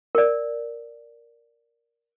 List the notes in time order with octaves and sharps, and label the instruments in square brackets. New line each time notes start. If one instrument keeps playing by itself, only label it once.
[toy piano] A#4 D5